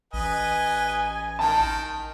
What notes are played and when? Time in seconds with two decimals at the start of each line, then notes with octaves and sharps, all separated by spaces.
0.13 A1 B4 D#5 G#5
1.39 D#3 G5 A5